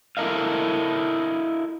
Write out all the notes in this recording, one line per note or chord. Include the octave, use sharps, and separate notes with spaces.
E4 A4 A#4 D#5 F5